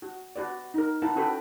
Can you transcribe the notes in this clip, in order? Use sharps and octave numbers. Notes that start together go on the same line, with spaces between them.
F#4
F#4 B4 D5
D#4 A#4
E4 B4 F#5 A5 A#5
C#4 F#4 A4 B4 G5 B5